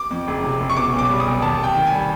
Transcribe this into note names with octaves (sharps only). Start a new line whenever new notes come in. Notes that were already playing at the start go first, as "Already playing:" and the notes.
Already playing: D6
F2
F#1
C3
F#1
C#6
B2 D6
B1
D6
G3
D#6
B1
D#2 A5
F1 G5
D#3
G#5
G3